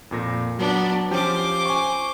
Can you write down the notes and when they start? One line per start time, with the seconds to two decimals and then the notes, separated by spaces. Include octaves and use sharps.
0.11 F2 A#2 A#6
0.59 F#3 B3 D4
1.11 F3 C#4 G4 C5 D6
1.66 G#5 C#6